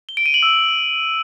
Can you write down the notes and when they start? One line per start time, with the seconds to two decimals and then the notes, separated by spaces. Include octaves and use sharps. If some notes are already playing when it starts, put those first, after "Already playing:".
0.09 G7
0.17 D7
0.26 D#7
0.34 F#7
0.43 E6